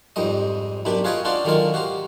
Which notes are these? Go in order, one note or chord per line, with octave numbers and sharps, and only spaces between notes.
F2 G#2 G3 D#5
B1 F#2 D4 G4 B5
F4 G#4 B4 C#5 D#5 G5
C#4 D4 F4 F#4 C5 D5
D3 D#3 F#3 G#3 F4 A#4
F#4 G4 C5 A#5